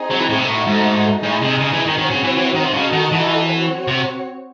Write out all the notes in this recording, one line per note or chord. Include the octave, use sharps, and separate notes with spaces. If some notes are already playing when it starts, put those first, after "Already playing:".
Already playing: C4 D#4 G#4
F#3
E3
A2
C3
A2 A3 D#4 F#4 A4
G#2
A2 D#4 G#4 D#5 G#5
C3
C#3
E3
D#3
D#3 C4 F#4 C#5
C#3
E3
E3
D#3
C3
C#3 D#4 F#4 A4 D#5 A5
D#3
E3
C4 F#4 C#5
C3